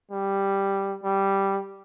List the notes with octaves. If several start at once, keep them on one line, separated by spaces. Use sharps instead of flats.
G3
G3